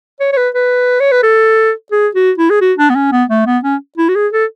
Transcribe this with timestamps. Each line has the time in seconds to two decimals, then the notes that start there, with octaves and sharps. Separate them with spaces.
0.20 C#5
0.33 C#5
0.37 B4
0.55 B4
1.00 C#5
1.12 B4
1.23 A4
1.92 G#4
2.15 F#4
2.38 E4
2.50 G#4
2.61 F#4
2.78 D4
2.90 B3
2.96 C#4
3.12 B3
3.30 A3
3.46 B3
3.64 C#4
3.98 E4
4.09 F#4
4.16 G#4
4.33 A4